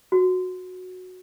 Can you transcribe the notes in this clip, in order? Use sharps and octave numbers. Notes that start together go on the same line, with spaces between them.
F#4